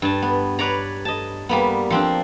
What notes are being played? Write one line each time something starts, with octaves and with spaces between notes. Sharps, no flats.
G2 A5
B3
B4 C#5 D5 A#5
D#5 A5
G3 A#3 B3
F3 C4 D4